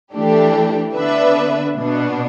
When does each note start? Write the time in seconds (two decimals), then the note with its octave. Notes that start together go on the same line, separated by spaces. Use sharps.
0.14 E3 A3 D4 G4
0.95 D3 B3 D4 B4 E5
1.75 B2 B3 D4